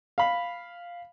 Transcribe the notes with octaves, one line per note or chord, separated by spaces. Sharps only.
F5 B5